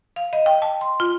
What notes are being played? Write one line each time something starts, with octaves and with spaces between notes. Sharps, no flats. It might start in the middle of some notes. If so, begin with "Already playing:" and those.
F5
D#5
G5
A5
C6
F4